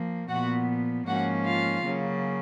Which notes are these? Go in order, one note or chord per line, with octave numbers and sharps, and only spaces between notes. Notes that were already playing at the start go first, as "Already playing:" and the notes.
Already playing: F3 A#3
A#2 F3 B3 F#4 F#5
G#2 F3 A#3 C#4 F#4 F#5
F4 F5
C#3 F#3 A#3 C#4